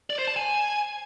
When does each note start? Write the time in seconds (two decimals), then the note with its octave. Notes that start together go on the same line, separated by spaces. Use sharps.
0.10 D5
0.19 C5
0.27 A5
0.36 G#5